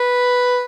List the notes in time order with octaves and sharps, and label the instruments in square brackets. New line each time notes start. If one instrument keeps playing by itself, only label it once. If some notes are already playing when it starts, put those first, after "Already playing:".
Already playing: [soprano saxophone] B4